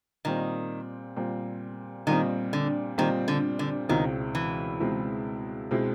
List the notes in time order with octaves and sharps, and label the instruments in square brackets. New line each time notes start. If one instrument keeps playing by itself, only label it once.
[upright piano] A#2 G3 C4 [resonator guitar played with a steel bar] D#3
[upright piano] A#2 G3 C4
[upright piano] A#2 G3 C4 [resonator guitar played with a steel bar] D#3
[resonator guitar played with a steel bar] D3
[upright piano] A#2 G3 C4 [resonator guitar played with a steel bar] D#3
[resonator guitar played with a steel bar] D3
D3
[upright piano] C#2 B2 G#3 C4 E4 [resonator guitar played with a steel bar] D#3
[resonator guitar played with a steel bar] E3
[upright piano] C#2 B2 G#3 C4 E4
B2 G#3 C4 E4